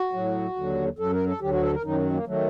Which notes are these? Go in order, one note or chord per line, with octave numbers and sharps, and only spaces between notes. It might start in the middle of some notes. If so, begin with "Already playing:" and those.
Already playing: F#4
A2 F#3
D#2 D3 F#3
F#2 F#3 A4
A#4
A4
D2 D3 F#3 G4
F#4
A4
A#4
F#2 D#3 F#3 D#4
A#3
D#3 F#3 A3